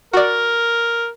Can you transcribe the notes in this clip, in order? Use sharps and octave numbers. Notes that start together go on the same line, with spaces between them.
F#4 A#4 D5